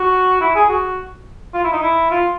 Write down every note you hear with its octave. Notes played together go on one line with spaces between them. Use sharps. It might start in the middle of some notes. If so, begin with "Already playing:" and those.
Already playing: F#4
E4
G#4
F#4
F4
E4
D#4
E4
F4